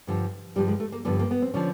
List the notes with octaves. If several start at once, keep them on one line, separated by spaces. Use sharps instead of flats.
G2 D3 F3
G2 D3 F3 G3
G#3
A3
A#3
G2 D3 F3 B3
A#3
B3
C4
D3 F3 C#4